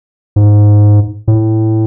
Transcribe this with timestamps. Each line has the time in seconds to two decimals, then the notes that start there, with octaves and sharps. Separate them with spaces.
0.36 G#2
1.28 A2